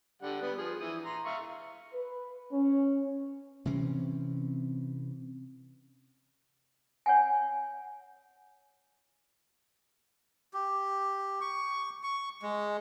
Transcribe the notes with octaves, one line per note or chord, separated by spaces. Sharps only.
D3 G3 F#5
G3 B3
F3 G#4
E3 D#6
A#5 C6
E5 F5 C#6
B4
C#4
C3 E3 C4 C#4
C#5 F#5 G#5
G4
C#6
C#6
G#3